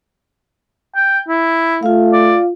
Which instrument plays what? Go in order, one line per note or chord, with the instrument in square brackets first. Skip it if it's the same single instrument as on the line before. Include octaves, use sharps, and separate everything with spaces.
[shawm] G5
E4
[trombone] A3 [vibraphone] F4 F5
[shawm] D5